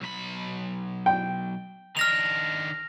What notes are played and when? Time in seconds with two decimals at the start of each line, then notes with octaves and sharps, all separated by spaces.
0.02 B1 B5
1.06 G5
1.97 D#3 D4 F6 A#6 F7